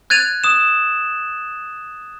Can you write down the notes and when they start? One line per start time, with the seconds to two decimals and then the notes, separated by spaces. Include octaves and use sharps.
0.10 F#6 G#6 A6 D#7 F7
0.44 D#6 E7